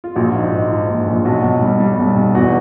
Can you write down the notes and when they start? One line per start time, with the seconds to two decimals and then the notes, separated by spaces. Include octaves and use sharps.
0.04 F4
0.15 A#1 F#4
0.34 G#2
0.52 G#2
0.71 F3
0.89 A#1
1.08 A#1
1.25 B1 F#4
1.44 B1
1.62 G3
1.80 G3
1.99 B1
2.16 B1
2.34 E2 F#4